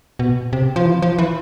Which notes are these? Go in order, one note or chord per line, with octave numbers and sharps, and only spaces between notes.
B2
C3
F3
E3
F3
E3